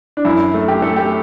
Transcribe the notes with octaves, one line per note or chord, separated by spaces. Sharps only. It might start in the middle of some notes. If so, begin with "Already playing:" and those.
D4
F#2 E4
A3
G4
A3 A4
G4